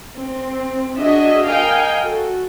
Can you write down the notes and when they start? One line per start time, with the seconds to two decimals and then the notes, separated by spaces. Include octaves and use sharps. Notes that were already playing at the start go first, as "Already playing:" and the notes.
0.17 C4
0.96 D4 F#4 G#4 D#5 E5
1.47 A#4 D#5 F5 G5 G#5
2.03 F#4 A4